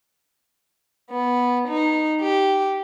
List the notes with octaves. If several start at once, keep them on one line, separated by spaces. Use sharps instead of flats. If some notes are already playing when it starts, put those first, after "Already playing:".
B3
D#4
G4